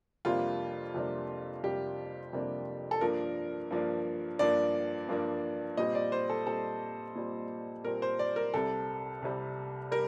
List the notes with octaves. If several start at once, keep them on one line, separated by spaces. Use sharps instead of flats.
F2 C3 G3 A#3 D4 F4
F2 C3 G3 A#3 D4
F2 C3 G3 A#3 D4 G4
F2 C3 G3 A#3 D4
A4
G2 F3 A#3 D4 A#4
G2 F3 A#3 D4
G2 F3 A#3 D4 D5
G2 F3 A#3 D4
A#2 G3 C4 D#5
D5
C5
A4
A#2 G3 C4 A4
A#2 G3 C4
A#2 G3 C4 A#4
C5
D5
A#4
C2 C3 G3 A4
C2 C3 G3
G3 A#4